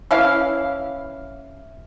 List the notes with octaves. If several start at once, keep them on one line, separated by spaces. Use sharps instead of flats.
E3 C#4 E4 F5